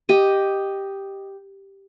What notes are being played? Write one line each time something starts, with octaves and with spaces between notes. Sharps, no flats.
G4 D#5